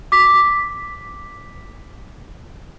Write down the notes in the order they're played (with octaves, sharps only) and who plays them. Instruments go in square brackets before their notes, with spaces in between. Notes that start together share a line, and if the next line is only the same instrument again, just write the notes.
[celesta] D6 B6